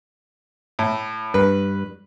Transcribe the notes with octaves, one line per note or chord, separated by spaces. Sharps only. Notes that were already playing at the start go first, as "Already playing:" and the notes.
A2
G2 B4